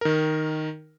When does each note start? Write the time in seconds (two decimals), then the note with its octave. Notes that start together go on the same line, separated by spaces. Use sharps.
0.01 D#3 A#4